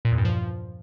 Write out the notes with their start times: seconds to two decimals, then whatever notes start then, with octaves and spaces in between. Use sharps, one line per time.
0.05 A#2
0.11 E2
0.18 G2
0.25 F3